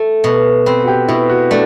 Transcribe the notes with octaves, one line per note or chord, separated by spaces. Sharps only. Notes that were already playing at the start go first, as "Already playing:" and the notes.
Already playing: A3
B2
C4 B4
F#4
G4
B2 E4
F#4
A3 D4